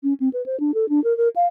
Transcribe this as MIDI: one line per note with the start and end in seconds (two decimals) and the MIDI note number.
0.03 0.13 61
0.20 0.29 60
0.33 0.44 71
0.46 0.59 72
0.60 0.72 62
0.74 0.89 69
0.89 1.02 62
1.04 1.16 70
1.17 1.28 70
1.36 1.47 77